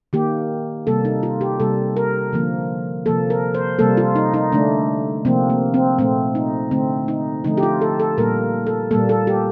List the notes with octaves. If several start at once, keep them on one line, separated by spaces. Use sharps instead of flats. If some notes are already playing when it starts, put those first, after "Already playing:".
D#3 A#3 G4
C3 G3 A#3 A4
D#4
F4
G4
C3 G3 A#3 A4
A#4
D3 F3 A#3
C3 F3 A#3 A4
A#4
C5
C3 G3 A#3 A4
F4
D#4
D#4
D3 A3 D4
C3 F3 A#3 C4
A#3
C4
A#2 A3 C4
D#4
D3 A3 C4
D#4
D3 F3 A3 D#4
G4
F4
A4
A4
A#2 G3 A#3 A#4
A4
A#2 G3 A#3 A4
A4
G4